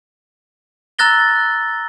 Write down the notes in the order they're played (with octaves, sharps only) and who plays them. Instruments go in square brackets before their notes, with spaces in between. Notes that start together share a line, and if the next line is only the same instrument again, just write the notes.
[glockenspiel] A#5 E6 F#6 A6 A#6 G7